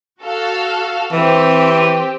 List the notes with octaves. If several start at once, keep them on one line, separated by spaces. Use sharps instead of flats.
F#4 A4 F5
E3 C4 G4